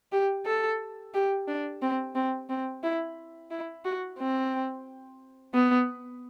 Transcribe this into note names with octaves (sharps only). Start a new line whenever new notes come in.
G4
A4
G4
D4
C4
C4
C4
E4
E4
F#4
C4
B3